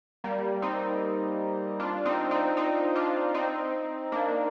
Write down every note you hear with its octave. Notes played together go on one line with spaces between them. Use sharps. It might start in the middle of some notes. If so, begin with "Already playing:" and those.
G3 A#3
C4 D#4
D4 F4
C4 D#4
C4 D#4
C4 D#4
D4 F4
C4 D#4
A#3 D4